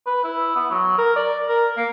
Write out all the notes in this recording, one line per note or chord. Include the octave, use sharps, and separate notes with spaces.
B4
E4
B3
F#3
A#4
D5
A#4
A#3